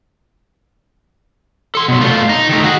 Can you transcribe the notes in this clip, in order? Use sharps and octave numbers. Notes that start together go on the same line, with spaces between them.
A4 C6
B2 F#3
A3 F4
D#4
D#3 A3
F#4 G#4